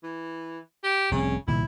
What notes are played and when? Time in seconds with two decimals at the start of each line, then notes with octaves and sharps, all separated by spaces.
0.03 E3
0.84 G4
1.11 F1 C2 C#3 C4
1.48 C2 A#2 D#3 E4